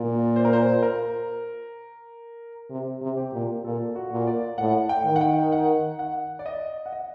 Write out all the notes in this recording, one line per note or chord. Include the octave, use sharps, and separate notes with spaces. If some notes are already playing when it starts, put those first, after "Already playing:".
Already playing: A#2 D5
C5
A#4
C5
A#4
C3
C3
G4
A#2
A#2 A4
F#4
A#2
D5
A2 F#5
G5
D#3
F#5
G5
F#5
F#5
D5
D#5
F#5
D#5